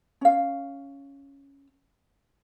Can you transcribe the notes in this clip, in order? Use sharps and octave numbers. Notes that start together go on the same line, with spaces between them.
C#4 F5